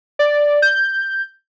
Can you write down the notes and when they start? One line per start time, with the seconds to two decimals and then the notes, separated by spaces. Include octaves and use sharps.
0.19 D5
0.62 G6